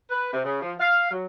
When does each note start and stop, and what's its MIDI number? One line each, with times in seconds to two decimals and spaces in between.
0.11 0.30 71
0.33 0.41 48
0.45 0.59 49
0.61 0.74 53
0.80 1.08 77
1.11 1.26 54